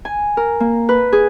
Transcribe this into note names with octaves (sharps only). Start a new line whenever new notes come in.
G#5
A#4
A#3
B4
G#4